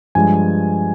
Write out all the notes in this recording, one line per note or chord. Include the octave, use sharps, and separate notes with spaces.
G2 F3 G#3 G#5